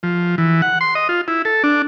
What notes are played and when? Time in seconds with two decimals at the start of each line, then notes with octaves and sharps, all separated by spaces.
0.03 F3
0.38 E3
0.62 F#5
0.81 C6
0.95 D#5
1.09 F4
1.28 E4
1.45 A4
1.64 D4